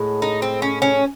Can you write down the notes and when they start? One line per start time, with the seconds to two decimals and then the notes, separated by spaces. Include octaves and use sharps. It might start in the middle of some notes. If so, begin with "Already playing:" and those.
Already playing: A2 G#3
0.22 D#4
0.42 C4
0.62 C#4
0.82 C#4